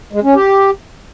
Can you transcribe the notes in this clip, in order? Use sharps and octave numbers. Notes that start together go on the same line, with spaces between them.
G#3
C#4
G4